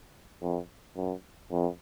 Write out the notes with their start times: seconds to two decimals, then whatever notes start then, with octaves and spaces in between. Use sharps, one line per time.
0.42 F2
0.96 F#2
1.51 F2